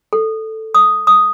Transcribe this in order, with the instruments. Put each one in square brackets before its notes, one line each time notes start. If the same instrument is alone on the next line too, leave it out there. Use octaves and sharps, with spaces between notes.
[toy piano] A4
D#6
D#6